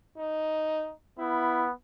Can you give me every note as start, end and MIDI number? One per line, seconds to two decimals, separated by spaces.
0.18 0.93 63
1.19 1.72 59
1.19 1.68 64